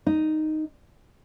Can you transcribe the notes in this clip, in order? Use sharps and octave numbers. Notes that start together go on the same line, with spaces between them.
D#4